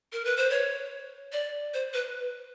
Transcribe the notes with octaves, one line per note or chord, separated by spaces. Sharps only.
A#4
B4
C5
C#5
D5
C5
B4